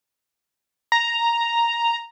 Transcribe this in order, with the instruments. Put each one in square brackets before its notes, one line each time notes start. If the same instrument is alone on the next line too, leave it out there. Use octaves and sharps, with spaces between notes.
[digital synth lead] A#5